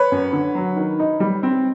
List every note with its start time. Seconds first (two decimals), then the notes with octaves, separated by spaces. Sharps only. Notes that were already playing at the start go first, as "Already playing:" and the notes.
Already playing: B4 C#5
0.12 F#2
0.33 D3
0.55 F#3
0.76 D#3
0.99 D#4
1.20 G3
1.43 C4